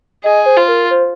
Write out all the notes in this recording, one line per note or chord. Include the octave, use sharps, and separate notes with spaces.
G#4 D#5
C5
F4
A#4
C5